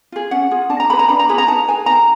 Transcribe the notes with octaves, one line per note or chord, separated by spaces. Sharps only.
F4 G#4
C#4 F#5
F4 G#4
D4 A5
A#5
F4 G#4 B4 B5
A#5
D4 B5
A#5
F4 G#4 B4 B5
A#5
D#4 A5
G#4 B4 G#5
D#4 A#5